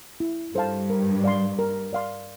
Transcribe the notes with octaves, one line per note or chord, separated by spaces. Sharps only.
E4
G2 A4 C5 F5 A5
A#4
D5 F5 C6
A#4
D5 F5 C6